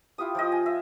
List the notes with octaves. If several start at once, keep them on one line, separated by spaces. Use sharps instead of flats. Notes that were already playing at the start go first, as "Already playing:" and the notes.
E4 F4 G4 D#6
F3 G4 D#5
G#5
E5